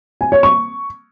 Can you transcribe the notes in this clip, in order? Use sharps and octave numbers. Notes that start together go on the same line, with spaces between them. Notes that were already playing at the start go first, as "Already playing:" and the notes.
G#5
C#5
C#6